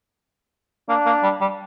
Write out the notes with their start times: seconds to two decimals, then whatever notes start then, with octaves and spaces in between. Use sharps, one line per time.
0.89 A#3 D4
1.06 A#3
1.23 G3
1.41 G3